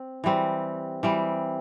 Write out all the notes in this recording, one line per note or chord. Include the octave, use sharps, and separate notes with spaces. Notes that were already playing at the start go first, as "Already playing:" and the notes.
Already playing: C4
E3 G3 C4
E3 G3 C4